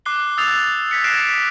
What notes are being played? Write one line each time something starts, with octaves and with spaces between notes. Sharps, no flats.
D6 F#6 C7 G7
D#6 E6 G6 A6 C7 F7
G#6 B6 C#7
F6 F#6 A#6 C7 D7 E7